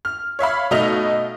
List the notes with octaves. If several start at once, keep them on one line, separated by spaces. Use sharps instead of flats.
F6
C#5 E5 F5 B5
B2 A3 D#4 D#5 F5 F7